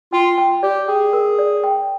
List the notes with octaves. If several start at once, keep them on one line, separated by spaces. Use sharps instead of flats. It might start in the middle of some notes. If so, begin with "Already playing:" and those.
F4 G5
G5
G4 D5
G#4 G5
A#4
D5
G5